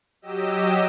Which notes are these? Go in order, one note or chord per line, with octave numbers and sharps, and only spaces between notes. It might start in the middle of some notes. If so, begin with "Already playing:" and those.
F#3 G4 D#5 E6